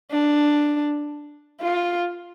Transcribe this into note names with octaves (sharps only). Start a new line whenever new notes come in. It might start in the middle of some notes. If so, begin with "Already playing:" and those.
D4
F4